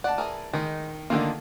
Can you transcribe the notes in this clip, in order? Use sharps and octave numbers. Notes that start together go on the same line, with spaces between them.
D5 F#5 A5
E3 G#4 A#4
D#3 G#3 D#4
D3 D#3 A#3 F4 A4